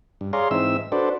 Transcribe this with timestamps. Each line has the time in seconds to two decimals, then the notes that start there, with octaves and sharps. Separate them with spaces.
0.21 G2
0.33 G#4 C#5 D5 F5 A#5 C6
0.51 G#2 E3 C4 D#4 E5 E6
0.92 D4 F#4 A4 B4 C5 D5